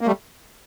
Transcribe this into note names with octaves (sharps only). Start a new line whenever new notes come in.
A#3
G3 A3